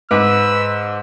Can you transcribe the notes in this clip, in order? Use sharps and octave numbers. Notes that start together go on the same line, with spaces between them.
G#2 B4 D6 E6